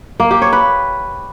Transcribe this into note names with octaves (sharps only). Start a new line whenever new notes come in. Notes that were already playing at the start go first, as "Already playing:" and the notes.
A#3
G4
C#5
B4